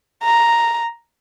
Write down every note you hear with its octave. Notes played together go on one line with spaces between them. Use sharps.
A#5